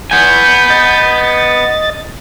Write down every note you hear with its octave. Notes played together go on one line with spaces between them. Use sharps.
B3 G#5 G6
D#5 A6